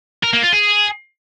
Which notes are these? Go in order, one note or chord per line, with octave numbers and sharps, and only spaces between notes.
A#4
A#3
F4
G#4